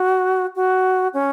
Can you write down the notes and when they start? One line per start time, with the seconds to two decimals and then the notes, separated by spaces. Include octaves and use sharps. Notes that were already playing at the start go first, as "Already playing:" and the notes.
Already playing: F#4
0.56 F#4
1.14 C#4